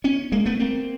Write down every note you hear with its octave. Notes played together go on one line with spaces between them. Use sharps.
B3 C#4
G#3 A#3
A3 B3
A#3 C4